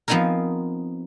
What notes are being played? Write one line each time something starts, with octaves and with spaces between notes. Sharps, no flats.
F3 B3 C4 D#4 G#4 A#4